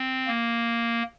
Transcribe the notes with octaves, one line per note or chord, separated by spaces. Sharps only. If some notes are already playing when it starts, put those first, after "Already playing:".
Already playing: C4
A#3